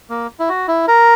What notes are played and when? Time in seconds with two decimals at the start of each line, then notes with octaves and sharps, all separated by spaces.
0.10 A#3
0.40 E4
0.49 F#4
0.68 E4
0.88 A#4